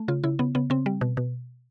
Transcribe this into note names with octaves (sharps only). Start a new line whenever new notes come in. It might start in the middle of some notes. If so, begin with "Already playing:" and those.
Already playing: A3
C#3 F4
C#3 E4
C#3 B3
C#3 B3
C#3 C4
G3
B2
B2